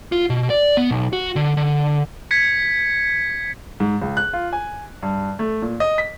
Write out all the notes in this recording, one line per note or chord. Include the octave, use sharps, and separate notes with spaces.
F4
B2
D5
B3
B1
F#4
D3
D3
G#6 B6 C#7
G#2
C#2
F#6
F4
G#5
G2
A3
A#2
D#5
B6